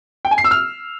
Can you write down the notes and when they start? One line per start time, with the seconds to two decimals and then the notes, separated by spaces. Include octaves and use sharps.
0.25 G5
0.31 G#5
0.38 C7
0.44 E6
0.51 F6